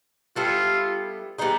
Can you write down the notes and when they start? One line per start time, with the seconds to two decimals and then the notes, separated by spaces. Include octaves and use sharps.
0.36 G3 B3 E4 F4 A4
1.38 G3 B3 D#4 G#4